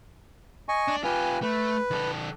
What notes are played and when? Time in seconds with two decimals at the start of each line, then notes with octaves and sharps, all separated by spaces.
0.69 D#5 G#5 C#6
0.88 D4
1.04 F4 G4 B4 G#5
1.42 A3 B4
1.91 D#3 A4